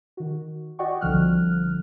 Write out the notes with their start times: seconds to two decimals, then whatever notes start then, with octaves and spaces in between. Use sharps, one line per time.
0.17 D#3 F#4
0.79 F#4 D5 D#5 F#5 G5 C#6
1.01 C2 D3 F3 F6 F#6